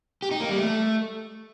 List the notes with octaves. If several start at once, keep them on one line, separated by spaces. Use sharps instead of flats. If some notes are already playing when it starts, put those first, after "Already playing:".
G4
D#4
A#3
G3
A3